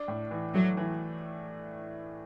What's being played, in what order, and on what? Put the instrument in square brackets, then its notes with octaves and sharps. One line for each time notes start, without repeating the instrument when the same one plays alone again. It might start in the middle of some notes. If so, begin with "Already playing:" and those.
Already playing: [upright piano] D4
A2
E3
[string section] F#3 [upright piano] A3
[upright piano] E3